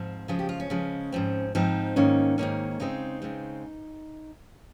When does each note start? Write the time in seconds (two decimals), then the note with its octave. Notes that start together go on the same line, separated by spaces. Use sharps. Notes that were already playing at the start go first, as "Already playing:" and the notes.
Already playing: G#2 F3 C4
0.28 C#3 F3 G#3 G#4
0.39 G4
0.49 F4
0.60 C#4
0.70 C#3 F3 G#3
1.12 G#2 F3 C4
1.55 G#2 F3 C4 D#4
1.96 G#2 D#3 A#3 C#4
2.38 G#2 D#3 A#3 C#4
2.80 C#3 G#3 C4 D#4
3.22 C#3 G#3 C4